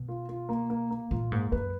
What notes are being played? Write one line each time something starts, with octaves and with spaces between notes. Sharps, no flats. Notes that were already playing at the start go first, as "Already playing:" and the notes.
Already playing: B2
F4
F4
A#3
A#3
A#3
A#2 F4
G#2 A#3
F#2 B4